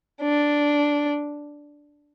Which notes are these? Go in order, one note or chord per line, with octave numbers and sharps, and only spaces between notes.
D4